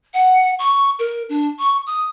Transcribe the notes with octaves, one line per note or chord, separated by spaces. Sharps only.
F#5
C#6
A#4
D4
C#6
D#6